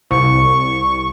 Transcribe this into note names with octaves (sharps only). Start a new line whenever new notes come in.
C2 C#6